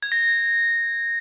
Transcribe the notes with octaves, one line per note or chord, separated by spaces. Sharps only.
G#6
A#6